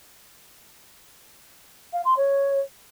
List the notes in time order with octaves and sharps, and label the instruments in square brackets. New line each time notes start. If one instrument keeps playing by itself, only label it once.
[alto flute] F5
C6
C#5